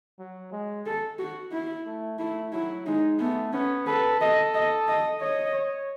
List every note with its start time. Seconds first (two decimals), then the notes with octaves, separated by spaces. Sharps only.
0.19 F#3
0.52 G#3
0.86 A4
1.19 F#4
1.52 E4
1.86 A3
2.19 A3 E4
2.53 F#3 E4
2.86 G#3 D#4
3.19 A3 B3
3.53 B3 C#4
3.87 A4 B4
4.21 A4 D#5
4.55 D#5
4.88 D#5
5.21 C#5 D#5
5.54 C#5